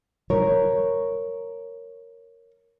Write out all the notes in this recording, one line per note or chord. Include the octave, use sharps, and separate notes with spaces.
A#4 C#5